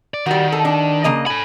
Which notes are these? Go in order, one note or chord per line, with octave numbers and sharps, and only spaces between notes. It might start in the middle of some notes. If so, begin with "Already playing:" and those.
D5
D#3 G3 F#4
A4
D4
C#3 A#3 D#5
A4 G#5 B5